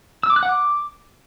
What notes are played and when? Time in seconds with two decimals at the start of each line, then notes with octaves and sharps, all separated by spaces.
0.23 E6
0.30 D6
0.36 F#6
0.43 F#5
0.49 D6